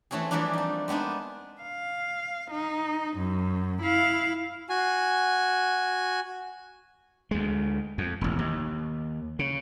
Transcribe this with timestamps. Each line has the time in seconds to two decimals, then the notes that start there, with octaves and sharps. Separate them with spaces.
0.11 E3 A3 C4 C#4 G#4
0.31 E3 F3 G3 A3 A#3 D4
0.53 C4 D#4
0.88 G#3 B3 C4 D4 D#4
1.62 F5
2.51 D#4
3.17 F#2
3.82 E4 F5
4.70 F#4 G#5
7.31 D2 G#3
7.98 F2
8.21 E1 A1
8.39 D#2
9.39 C#3